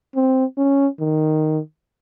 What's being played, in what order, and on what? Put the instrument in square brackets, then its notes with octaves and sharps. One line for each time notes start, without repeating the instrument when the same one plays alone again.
[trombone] C4
C#4
D#3